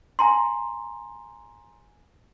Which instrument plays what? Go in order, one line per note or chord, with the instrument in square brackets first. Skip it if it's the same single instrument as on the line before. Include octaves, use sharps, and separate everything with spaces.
[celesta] G#5 A#5 C6